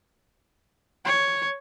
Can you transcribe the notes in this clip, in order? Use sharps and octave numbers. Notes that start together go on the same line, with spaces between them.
C#5